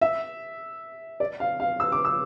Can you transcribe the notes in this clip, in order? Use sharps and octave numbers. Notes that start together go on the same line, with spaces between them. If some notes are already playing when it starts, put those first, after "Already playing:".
E5
D5
F5
F5
E6
D6
E6